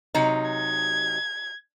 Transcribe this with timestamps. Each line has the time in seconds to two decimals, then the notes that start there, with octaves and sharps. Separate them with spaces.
0.15 C3 F#3 D#4
0.51 G#6